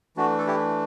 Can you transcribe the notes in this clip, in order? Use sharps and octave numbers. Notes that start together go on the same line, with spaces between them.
E3 A3 D4 F#4
A4
E4 G4